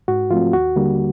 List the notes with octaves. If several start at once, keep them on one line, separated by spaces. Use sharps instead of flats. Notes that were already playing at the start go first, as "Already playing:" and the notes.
G#2 F#4
F3 A3 C4 F4
D#2 F#4
D3 G3 A#3